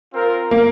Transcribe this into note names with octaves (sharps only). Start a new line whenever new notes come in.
C4 F4 A#4
A#3